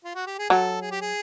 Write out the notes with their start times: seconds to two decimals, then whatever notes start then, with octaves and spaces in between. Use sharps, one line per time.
0.04 F4
0.15 F#4
0.27 G4
0.38 G#4
0.50 F#3 A4
0.81 G#4
0.91 G4
1.01 G#4